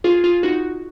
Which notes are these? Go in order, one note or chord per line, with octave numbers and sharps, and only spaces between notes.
F4 G#4
F4 G#4
D#4 F#4